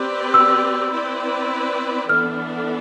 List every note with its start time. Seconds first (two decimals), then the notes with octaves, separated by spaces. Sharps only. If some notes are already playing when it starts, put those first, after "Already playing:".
Already playing: C4 G4 B4 D5
0.34 E6
0.93 C4 E4 B4 D5
2.09 E3 B3 D4 A4 F6